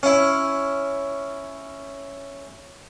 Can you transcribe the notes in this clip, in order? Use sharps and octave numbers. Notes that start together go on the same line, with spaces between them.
C#4 E4